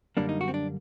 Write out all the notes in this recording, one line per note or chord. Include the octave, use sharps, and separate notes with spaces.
F#2 D3 G3 A#3 D4
D#4
F#4
C4
D4